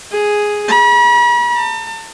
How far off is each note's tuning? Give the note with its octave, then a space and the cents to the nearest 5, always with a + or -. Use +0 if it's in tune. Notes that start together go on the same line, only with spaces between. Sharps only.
G#4 +0
B5 -45
A5 +40